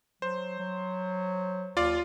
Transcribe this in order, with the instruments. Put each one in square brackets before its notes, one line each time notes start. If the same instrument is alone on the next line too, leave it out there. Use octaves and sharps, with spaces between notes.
[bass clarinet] F#3 [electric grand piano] C5
[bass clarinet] F#3
[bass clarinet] D#2 [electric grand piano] F4 D5 F5